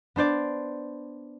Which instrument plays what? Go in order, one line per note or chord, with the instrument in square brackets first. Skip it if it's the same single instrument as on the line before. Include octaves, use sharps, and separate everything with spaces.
[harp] B3 D4 C5 D5